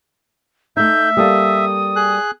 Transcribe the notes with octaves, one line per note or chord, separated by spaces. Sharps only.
A3 D#4 E5 G6
G3 A#3 A4 D#6
G#4 F#6